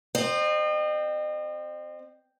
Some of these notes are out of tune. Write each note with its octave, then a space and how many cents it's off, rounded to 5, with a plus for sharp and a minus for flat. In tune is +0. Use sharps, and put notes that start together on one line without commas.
C4 +0 D#5 -40